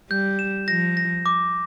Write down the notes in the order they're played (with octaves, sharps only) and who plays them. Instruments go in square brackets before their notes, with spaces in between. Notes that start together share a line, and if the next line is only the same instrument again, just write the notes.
[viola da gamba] G3 [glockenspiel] G6
[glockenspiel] E7
[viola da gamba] F3 [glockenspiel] A#6
[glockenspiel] A#6
D6